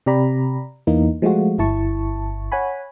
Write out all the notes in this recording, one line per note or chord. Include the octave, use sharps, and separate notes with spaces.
C3 G4 D5 A#5 B5
E2 E3 A#3 D#4
F3 G#3 A3 F4 F#4
G1 E4 A5 C#6
C#5 F#5 G#5 B5